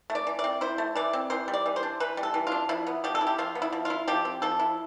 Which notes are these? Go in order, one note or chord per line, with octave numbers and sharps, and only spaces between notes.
A3
D5
E3
D5
C4
E4 C5
A3
E3 D5
C4
E3 C5
G3
D5
E3
C5
D4
E3 B4
G3
A4
E3
D4 F4
F3 E4
B3
F3 G4
A4
E4
G4
F3 F4
B3
E4
F3
E4 F4
F3 G4
C4
F3 A4
E4